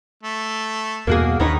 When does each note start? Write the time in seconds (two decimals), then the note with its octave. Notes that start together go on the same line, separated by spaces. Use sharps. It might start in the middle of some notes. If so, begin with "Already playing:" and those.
0.23 A3
1.07 E2 G2 B2 A#3 F#4 G#4
1.40 D#2 D#3 D4 D#4 B4 C#5